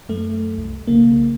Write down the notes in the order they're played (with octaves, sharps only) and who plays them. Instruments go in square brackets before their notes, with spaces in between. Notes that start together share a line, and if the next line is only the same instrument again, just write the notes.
[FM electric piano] F#2 A3
[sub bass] C2
[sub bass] B1 [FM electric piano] C#3 A#3